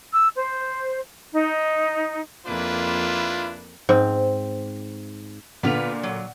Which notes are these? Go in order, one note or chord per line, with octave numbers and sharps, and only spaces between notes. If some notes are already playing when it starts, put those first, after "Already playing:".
E6
C5
D#4
F2 A#3 D4 E4 F4 B4
G#2 C4
A#2 D3 B3 F4 B4 F7
F#3